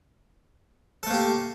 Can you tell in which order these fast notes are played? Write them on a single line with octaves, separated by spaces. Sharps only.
A4 A3 A#3 G4